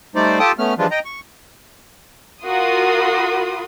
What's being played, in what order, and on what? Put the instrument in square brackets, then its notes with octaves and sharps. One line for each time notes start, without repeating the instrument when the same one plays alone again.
[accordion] G3 A3 D#4 C5 D5
F4 G4 A4 G5 A5 D#6
A3 B3 C#4 F6
E3 F3 G3 G#3 D4 F4
D#5 G5 A#5
C#6
[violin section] F4 F#4 A#4 C6 D#6